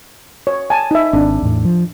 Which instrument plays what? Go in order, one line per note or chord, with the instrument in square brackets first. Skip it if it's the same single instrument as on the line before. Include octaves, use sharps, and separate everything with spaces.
[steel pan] C#5
G#5 A5
D#4 E5
[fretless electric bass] G#1 C4 [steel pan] D4
[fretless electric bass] E2 A2
F3